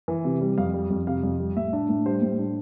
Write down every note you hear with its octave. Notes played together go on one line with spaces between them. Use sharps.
E3
C3
G3
F2 F5
G3
F2
C3 F5
F2
G3
A2 E5
D4
A2
G3 C5
A2
D4